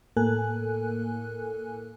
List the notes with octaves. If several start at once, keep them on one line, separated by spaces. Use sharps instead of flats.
A2 A#3 A4 A#4 G#5 F#6